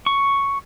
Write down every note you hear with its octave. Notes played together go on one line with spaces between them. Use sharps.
C#6